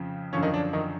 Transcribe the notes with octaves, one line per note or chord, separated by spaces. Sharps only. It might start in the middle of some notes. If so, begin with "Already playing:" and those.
Already playing: F2 C#3 F3
F#2 D3 F3 C#4
D#3 D#4
D4
D#3 D#4